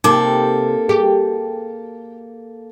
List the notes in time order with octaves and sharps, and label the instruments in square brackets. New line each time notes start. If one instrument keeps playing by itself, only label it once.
[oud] C3 [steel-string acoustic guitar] A#3 A4 [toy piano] D#4 D6
[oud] G4 [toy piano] G#4